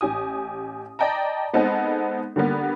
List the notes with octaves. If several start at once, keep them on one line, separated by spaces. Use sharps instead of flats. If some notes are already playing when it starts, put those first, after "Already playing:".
A1 G4 G#5 D#6
D5 D#5 G5 A5 A#5
G#3 B3 C4 D#4 A4
D3 G3 A#3 B3